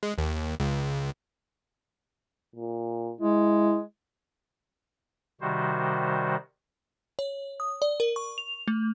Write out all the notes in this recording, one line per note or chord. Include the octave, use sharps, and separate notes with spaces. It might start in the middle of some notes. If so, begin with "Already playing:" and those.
G#3
D#2
C#2
A#2
G#3 E4
C3 D#3 G3 F#4 C5
C#5
D#6
D5
A#4
C#6
F7
A3